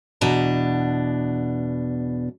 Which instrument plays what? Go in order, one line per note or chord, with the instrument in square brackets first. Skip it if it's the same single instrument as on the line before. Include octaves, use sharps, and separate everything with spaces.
[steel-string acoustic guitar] E2 B2 D4 A#5